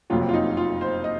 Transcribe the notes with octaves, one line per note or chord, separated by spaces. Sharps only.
F#1 F2 C3 F#3 F4
F4
D#4
F4
C5
D#5